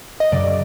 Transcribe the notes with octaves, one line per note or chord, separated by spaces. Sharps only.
D#5
F#2 C#3 F#3 D5